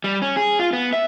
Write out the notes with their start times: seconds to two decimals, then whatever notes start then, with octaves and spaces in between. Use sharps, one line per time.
0.04 G3
0.22 C#4
0.36 G#4
0.59 F4
0.73 B3
0.93 E5